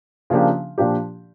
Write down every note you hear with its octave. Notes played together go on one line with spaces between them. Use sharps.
C#3 F3 A#3 D4 G4
A#2 F3 A#3 D4 G4